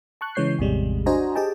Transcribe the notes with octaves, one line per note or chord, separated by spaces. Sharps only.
A5 C#6 F#6
C#3 E3 G#3 C#5 G6 C7
A1 E2 C3 G3 G#3
D4 F#4 C5 D#5 G#5 A#5
G4 G#4 D#5 G5 A5